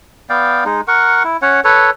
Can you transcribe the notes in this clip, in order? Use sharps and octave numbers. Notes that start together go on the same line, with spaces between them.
B3 D5 F5 G5
G#3 D#4
A#4 F#5 C#6
E4
C#4 C#5 F#5
A4 B4 C#5